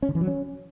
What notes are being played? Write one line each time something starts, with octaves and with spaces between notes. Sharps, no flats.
C#4
D3
E3
F#3
C#4